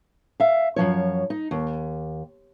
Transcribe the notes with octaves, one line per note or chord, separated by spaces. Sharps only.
E5 F5
F#2 C#3 F3 C#5
D#4
D#2